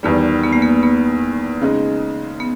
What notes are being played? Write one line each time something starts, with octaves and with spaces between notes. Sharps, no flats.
E2 D#3 G3 B3
B3
A#3
B3
B3
C#3 G#3 D#4
B3